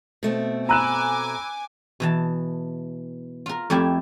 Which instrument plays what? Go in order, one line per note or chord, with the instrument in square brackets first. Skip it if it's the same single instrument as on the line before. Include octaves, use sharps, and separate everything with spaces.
[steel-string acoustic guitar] B2 A3 C4
[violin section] G#5 D6 [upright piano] A#5 F#6 E7 [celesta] B5 E6 D#7
[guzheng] B2 E3 A5
F4 A#4
F2 A3 E4 G4 G#5